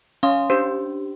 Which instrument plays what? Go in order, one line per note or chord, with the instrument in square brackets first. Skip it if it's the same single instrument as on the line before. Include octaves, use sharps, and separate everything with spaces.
[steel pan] C#4 [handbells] F5 C6 D#6
[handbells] D4 G4 [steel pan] C5